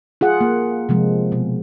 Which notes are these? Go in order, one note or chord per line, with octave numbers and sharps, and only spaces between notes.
F4 G#4 F#5
A#3
C3 F3 G#3
B2